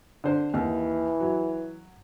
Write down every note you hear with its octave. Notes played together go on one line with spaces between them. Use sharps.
D3 D4 C5
D#2 E3
F#3